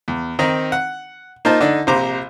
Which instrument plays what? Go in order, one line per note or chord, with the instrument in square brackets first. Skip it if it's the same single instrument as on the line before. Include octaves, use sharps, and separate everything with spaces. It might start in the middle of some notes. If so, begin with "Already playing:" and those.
[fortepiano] E2
D#3 C4 D#4 A#5
F#5
A#3 D#4 F4 C5 D#5 A5
D3 D4 D#4
A#1 C3 C5 A#5 D6